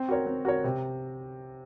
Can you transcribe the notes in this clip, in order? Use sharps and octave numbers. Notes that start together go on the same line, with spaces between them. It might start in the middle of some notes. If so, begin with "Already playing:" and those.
Already playing: C4
F#4 A#4 C#5
C4
F#4 A#4 C#5
C3